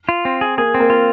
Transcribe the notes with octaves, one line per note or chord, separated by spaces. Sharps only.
F4
C4
G#4
A#3 G#4
C4
A#3
F4